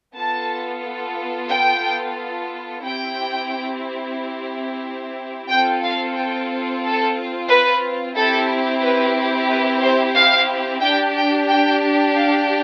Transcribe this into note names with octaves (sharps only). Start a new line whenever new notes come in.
B3 F4 A4 A5
G5
C4 E4 G4 G5
C4 F4 A4 G5
F5
G5
A4
B4
C4 E4 G4 A4
B4
B4
C5
F5
D4 G4 G5
G5
G5
F5